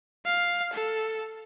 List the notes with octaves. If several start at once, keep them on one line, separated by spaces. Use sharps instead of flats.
F5
A4